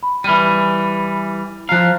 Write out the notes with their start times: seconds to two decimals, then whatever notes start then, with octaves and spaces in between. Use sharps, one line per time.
0.03 B5
0.24 E3 G3 B5 F6 D#7
1.69 F3 F5 A#5 F#6